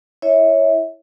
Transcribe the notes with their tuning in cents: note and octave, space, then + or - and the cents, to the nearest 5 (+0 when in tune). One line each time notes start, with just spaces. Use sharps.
E4 +0 C#5 +0 E5 -25